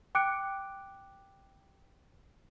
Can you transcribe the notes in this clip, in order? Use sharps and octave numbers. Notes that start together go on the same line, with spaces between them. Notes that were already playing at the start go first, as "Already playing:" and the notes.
G5 D6 F#6 C#7 D7